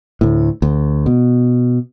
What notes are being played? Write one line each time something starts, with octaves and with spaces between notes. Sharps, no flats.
D2 A2
D2
B2